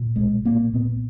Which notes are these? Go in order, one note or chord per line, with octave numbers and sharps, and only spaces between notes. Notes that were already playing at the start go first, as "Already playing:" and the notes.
Already playing: A#2
B1 G#3
A#2 A#3
A#2 B3